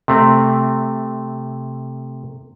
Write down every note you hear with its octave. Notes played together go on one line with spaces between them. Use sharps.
C3 A3 C4